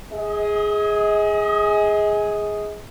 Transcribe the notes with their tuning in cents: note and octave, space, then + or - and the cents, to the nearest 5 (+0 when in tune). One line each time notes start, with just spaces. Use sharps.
G#4 +0 D#5 +35